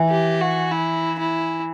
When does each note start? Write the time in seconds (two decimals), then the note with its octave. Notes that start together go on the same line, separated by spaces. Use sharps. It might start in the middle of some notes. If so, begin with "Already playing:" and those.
Already playing: E3
0.10 G4
0.41 F#4
0.72 E4
1.19 E4